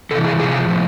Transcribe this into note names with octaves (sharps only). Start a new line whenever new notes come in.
C3 E3 A4
G#4
C3 F3 G#4
A2 F3